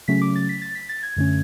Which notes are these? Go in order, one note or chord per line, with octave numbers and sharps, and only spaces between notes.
C#3 F#3 A3 C#4 B6
D6
A6
B6
A6
B6
A6
G#6
F#2 D3 A3 C#4